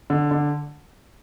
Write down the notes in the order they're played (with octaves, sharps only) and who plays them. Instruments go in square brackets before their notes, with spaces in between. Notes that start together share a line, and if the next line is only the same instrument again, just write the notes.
[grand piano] D3
D3